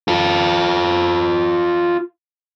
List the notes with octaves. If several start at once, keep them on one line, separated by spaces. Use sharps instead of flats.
F4 A4